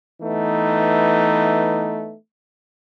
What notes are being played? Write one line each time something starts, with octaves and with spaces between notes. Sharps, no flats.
E3 A3 B3 D#4